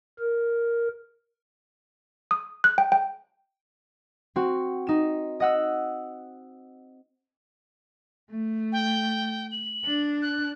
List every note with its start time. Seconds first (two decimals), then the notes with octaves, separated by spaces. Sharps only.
0.19 A#4
2.31 D#6
2.64 F#6
2.78 G5
2.92 G5
4.36 C4 F#4
4.87 D#4 E7
5.40 D#5 F#5 E6
8.30 A3
8.72 G5
9.52 F#7
9.85 D4
10.22 F#6